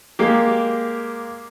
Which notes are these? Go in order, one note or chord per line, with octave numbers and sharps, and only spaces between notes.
G#3 A#3 G4